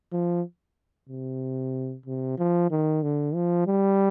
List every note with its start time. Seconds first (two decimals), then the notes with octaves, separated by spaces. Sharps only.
0.12 F3
1.09 C3
2.06 C3
2.38 F3
2.71 D#3
3.03 D3
3.34 F3
3.67 G3